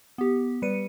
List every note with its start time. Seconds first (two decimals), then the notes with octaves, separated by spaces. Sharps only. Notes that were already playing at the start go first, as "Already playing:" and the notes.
0.18 B3 G4
0.62 G3 B4 C#7 D#7